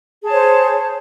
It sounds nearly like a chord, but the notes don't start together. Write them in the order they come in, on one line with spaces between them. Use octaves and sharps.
G#4 A5 C#5 C5